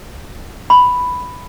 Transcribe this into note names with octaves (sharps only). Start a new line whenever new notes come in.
B5